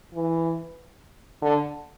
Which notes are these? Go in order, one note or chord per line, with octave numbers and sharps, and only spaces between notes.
E3
D3